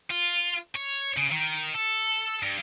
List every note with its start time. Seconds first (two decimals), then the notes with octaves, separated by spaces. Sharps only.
0.10 F4
0.76 C#5
1.17 C#3
1.32 D#3
1.74 A4
2.43 G2